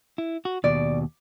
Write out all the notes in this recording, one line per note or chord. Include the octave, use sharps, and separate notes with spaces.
E4
F#4
D#2 B2 D5